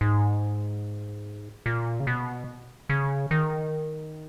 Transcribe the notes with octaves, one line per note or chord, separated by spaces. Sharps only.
G#2
A#2
C#3
B2
C#3
D#3